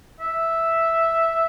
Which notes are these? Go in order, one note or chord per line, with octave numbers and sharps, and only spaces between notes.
E5